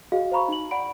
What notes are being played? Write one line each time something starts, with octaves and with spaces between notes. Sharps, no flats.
F#4 G#4 D#5 F5
C5 F5 A#5 B5 C#6
D#4 F#7
D5 F#5 B5 D7